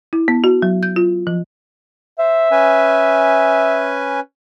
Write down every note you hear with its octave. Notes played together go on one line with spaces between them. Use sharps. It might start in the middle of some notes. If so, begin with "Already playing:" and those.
E4
B3
F#4
F#3
G6
F4
F3
C5 E5
C#4 B4 G#5